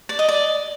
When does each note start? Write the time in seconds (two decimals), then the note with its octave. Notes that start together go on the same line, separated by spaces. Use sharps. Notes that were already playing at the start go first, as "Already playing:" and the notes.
0.09 D5
0.19 D#5
0.28 D5